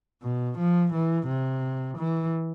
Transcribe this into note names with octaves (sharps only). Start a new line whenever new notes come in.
B2
F3
E3
C3
E3